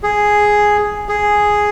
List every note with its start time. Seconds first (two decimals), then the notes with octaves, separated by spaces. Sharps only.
0.03 G#4
1.09 G#4